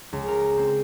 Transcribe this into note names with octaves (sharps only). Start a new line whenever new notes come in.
C#2
A#4
C4